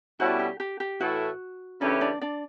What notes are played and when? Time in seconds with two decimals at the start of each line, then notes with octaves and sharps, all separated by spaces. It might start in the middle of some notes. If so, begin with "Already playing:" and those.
0.19 B2 G3 C#4 E4 F#4 A4
0.39 G4
0.60 G4
0.80 G4
1.00 A2 E3 A3 E4 F#4 A4
1.81 C#3 E3 A3 C#4 D4 G4 D5
2.01 D4 D5
2.21 D4 D5